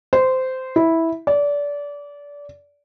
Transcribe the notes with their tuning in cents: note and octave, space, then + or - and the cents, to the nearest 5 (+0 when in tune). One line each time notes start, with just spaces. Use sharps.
C5 -15
E4 -10
D5 -25